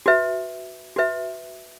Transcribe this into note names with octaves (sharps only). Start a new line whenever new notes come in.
F#4 B4 E5
F#4 B4 E5